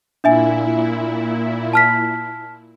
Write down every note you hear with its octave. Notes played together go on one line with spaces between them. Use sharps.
A#2 D4 E4 E5 G#5
A5 F6 B6